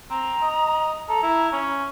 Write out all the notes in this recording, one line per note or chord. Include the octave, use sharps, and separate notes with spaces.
C4 A#5
D#5
A4 A#5
E4
C#4